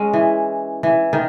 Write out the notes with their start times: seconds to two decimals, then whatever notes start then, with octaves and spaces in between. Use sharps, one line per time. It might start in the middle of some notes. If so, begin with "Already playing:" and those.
Already playing: G#3 C#4
0.13 E3
0.83 E3
1.13 D#3